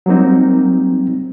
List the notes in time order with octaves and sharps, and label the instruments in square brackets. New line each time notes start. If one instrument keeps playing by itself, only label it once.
[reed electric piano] F#3 G3 A#3 C4 D#4